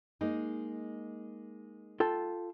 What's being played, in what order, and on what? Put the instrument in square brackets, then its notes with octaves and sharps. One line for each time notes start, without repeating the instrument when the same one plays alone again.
[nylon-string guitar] G#3 A#3 D#4
[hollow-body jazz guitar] F4 A4 G5